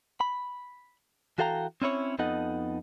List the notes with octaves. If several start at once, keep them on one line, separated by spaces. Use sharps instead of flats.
B5
E3 F#4 A4 F5 G5 A#5
C4 C#4 E4 C#5
F2 B3 D#4 A4 D#5 F#5